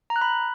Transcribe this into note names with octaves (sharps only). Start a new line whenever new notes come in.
A#5
F#6
B5